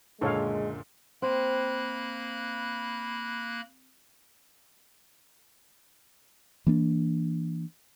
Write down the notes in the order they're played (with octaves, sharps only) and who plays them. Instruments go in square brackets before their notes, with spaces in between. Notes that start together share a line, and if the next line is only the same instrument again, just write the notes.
[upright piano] F#1 A#2 D3 [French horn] G#3 [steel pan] A4 C#5 F5
[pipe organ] A#3 B5 F#6 [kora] C4
[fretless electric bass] E3 A#3 D4